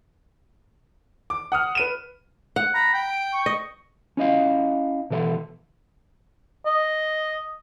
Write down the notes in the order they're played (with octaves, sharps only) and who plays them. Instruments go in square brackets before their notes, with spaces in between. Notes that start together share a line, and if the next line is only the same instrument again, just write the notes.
[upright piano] D6
F#5 D#6 F6
B4 D#7 E7
[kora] F#5
[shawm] A#5 [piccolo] B5
[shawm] G5
[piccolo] D7
C#6
[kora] D#5
[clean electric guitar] C#4 E4 D#5 F5
B2 E3 A4 D5 E5 C6
[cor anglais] D#5